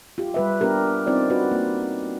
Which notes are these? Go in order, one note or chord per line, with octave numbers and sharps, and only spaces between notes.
F4 G4
G3 B4 E5
B3 D4 G4 A#4
C4 D#4 F4 C5 D5
F#4 B4
A#3 F#4